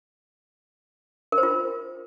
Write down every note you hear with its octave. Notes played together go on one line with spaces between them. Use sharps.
A#4
C5
F4